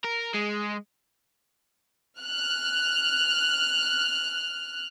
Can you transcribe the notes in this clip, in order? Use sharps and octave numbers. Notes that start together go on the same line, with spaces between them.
A#4
G#3
F6 F#6